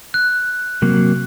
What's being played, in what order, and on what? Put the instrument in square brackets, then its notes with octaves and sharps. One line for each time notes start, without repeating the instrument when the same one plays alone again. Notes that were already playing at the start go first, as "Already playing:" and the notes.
[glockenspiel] F#6
[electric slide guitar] C3 F#3 A#3